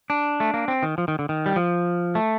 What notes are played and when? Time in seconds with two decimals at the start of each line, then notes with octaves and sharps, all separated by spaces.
0.10 D4
0.40 A3
0.54 A#3
0.68 C4
0.83 D#3
0.98 F3
1.08 D#3
1.19 D3
1.29 D#3
1.46 G3
1.56 F3
2.15 A3